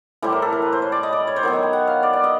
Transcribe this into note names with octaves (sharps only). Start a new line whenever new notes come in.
A2 E3 G3 C5
A#4
A4
A#4
B4
C5
C#5
D5
D#5
D5
C#5
C5
D#3 F#3 B3 C#5
D#5
G5
F#5
F5
D5
D5
D#5